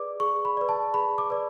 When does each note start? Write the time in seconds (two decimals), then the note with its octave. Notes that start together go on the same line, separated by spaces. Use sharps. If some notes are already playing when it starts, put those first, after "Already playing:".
Already playing: G#4 B4 D5 D6
0.20 G#4 C#6
0.45 B5
0.57 B4 D5
0.69 A5
0.94 G#4 B5
1.18 D6
1.30 B4 D5